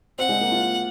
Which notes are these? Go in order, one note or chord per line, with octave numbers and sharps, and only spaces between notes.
C4 F#5
G#3
A#3
F4